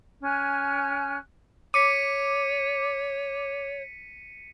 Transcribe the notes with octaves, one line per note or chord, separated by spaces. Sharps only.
C#4 G#5 F6 F#6
C#5 D6 B6 C#7 D#7